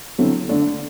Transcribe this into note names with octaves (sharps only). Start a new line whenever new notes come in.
D3 F#3 C4 E4 A4
D3 A3 D4 A4